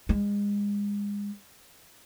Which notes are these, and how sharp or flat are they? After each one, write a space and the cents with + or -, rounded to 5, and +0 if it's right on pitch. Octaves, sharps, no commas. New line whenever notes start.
G#3 -30